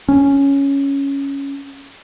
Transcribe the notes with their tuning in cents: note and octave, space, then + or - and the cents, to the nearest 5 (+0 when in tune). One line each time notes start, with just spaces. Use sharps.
C#4 +5